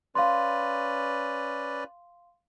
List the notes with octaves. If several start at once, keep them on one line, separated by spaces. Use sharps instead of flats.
C#4 B4 D5 F5 C6